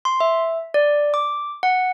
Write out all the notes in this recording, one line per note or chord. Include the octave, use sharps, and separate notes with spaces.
C6
E5
D5
D6
F#5